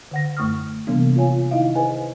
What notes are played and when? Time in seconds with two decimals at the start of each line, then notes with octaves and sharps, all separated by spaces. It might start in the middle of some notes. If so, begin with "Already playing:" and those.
0.11 D3 F#5 A#6
0.37 F#2 A3 C#6 D#6 F6
0.87 C3 E3 G3 A#3 B3 D4
1.16 F4 C#5 F5 G#5
1.51 D#3 D#4 E4 D#5 F5
1.75 G#4 B4 C5 D#5 G#5